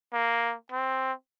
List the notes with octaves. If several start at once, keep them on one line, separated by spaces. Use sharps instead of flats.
A#3
C4